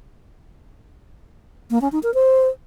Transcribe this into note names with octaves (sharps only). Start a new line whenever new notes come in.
A#3
C#4
D#4
A#4
C5